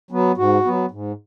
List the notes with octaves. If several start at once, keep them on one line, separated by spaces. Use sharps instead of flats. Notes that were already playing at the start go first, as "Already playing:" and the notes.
F#3 B3
G#2 F#4
F#3 B3
G#2